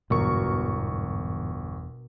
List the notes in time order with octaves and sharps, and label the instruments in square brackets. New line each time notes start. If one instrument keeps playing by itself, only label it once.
[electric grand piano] G1 C#6 [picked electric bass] E2 [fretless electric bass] G#2 E3 [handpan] B2 A#4